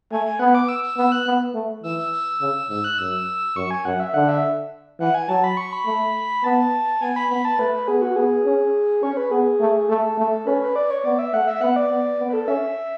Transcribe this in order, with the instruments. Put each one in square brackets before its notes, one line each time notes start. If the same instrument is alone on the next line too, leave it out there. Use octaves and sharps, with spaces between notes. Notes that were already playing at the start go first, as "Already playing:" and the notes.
[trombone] A3 [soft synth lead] G#5
[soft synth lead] G#5
[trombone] B3 [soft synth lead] F#5
[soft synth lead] D6
E6
E6
[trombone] B3 [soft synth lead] E6
[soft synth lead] F#6
[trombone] B3
A3
[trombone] E3 [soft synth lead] E6
[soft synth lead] E6
E6
[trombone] C#3
[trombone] G#2 [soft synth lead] E6
[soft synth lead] F#6
[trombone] F#2 [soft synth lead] E6
[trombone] F#2 [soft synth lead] C#6
[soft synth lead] G#5
[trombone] F#2 [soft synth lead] F#5
[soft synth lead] E5
[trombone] D3 [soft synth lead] F#5
[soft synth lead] E5
[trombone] E3 [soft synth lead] F#5
[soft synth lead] G#5
[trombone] F#3 [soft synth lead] A5
[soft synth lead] B5
C#6
B5
[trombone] A3
[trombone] B3 [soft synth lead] A5
[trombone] B3 [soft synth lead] G#5
[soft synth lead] B5
[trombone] B3 [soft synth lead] B5
[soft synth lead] A5
[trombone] A3 [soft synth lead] B4
[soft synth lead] B4
[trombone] B3 [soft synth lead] G#4
[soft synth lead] F#4
[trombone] B3 [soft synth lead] G#4
[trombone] C#4
[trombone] C#4 [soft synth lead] C#5
[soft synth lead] B4
[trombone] B3 [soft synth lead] G#4
[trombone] A3
[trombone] A3 [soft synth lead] A4
[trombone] A3
[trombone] C#4 [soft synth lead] B4
[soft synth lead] B4
D5
C#5
[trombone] B3 [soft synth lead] D5
[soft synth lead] E5
[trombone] A3 [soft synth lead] F#5
[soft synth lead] E5
[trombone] B3 [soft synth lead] F#5
[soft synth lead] D5
[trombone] B3
B3
[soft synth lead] B4
A4
[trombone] C#4 [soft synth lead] E5